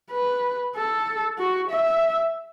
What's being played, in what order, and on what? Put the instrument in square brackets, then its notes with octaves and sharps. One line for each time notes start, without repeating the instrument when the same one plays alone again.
[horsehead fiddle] B4
A4
F#4
E5